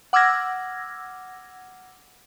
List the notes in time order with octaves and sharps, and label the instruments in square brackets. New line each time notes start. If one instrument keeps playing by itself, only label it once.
[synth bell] F#5 D6 E6 F6 G#6 A#6